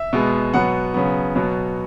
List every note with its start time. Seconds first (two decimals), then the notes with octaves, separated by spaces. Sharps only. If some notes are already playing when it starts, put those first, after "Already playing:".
Already playing: E5
0.13 B2 G#3 B3
0.54 B2 F#3 B3 F#5
0.94 C#3 F#3 B3
1.35 B2 F#3 B3